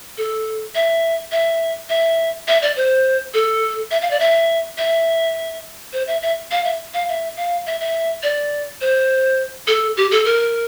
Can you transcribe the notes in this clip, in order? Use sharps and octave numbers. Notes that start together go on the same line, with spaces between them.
A4
E5
E5
E5
E5
D5
C5
A4
E5
F5
D5
E5
E5
C5
E5
E5
F5
E5
F5
E5
F5
E5
E5
D5
C5
A4
G4
A4
A#4